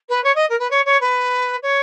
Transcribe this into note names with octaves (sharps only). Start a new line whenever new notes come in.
B4
C#5
D#5
A#4
B4
C#5
C#5
B4
C#5